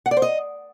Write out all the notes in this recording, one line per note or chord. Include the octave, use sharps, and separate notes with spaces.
F#5
D5
C5
D#5